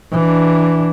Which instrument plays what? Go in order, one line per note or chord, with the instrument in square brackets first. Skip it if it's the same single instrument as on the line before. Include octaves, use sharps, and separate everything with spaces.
[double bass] E3 D4